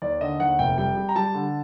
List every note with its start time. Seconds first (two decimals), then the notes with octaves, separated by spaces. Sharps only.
0.02 D#2 D5
0.21 D3 D#5
0.40 D#2 F#5
0.59 F1 G5
0.78 G3 G5
0.97 G3
1.09 A#5
1.16 G3 A5
1.35 D3